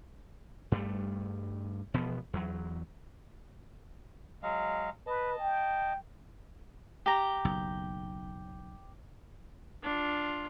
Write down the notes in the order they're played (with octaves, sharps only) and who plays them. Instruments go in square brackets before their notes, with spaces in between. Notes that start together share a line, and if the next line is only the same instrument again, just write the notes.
[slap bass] G2 G3 A3
E1 B2 F3 B3
E2 F#3
[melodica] F#3 G#3 F5
[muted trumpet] B4 [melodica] D#5 A5
[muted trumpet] G5
[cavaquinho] G4 A#5
[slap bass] F#1 B1
[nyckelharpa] D4 F4